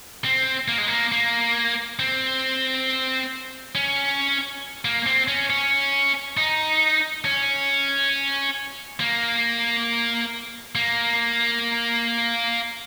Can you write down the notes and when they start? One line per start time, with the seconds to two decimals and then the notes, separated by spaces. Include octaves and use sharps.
0.25 C4
0.68 A#3
0.78 G#3
0.87 A#3
1.12 A#3
1.99 C4
3.75 C#4
4.85 A#3
5.06 C4
5.28 C#4
5.50 C#4
6.37 D#4
7.25 C#4
9.00 A#3
10.75 A#3